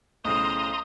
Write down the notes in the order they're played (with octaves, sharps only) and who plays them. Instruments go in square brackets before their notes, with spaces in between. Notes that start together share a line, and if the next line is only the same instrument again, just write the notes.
[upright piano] B1 A2 C#3 [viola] C5 D#5 [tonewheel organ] A#5 C6 D#6